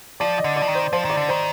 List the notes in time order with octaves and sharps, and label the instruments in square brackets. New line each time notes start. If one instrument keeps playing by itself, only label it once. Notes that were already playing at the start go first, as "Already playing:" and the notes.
[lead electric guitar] F3 [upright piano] D5
[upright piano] D#5
[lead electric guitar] D3
[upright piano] D5
[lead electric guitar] F3
D#3
[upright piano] C5
[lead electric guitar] F3 [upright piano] C5
[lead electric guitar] D#3 [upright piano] D5
[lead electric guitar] D3
[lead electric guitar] D#3 [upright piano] C5